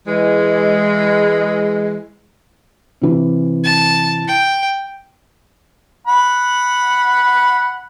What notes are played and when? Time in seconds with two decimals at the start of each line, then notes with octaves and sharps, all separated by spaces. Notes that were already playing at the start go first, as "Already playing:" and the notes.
0.07 E3 G#3
3.01 C3 E3
3.64 A5
4.28 G5
6.07 F#5 B5